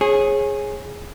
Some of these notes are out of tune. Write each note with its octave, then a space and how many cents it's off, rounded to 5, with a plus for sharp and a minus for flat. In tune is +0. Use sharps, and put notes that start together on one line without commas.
G#4 +0 C#5 -30